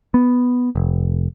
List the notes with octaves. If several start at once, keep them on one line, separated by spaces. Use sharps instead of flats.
B3
F1